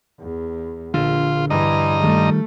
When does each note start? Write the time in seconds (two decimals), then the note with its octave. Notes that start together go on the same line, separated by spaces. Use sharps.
0.20 E2
0.94 A#1 D3 F4
1.50 G2 E3 D#5 A#5
2.04 D#3 G3 A3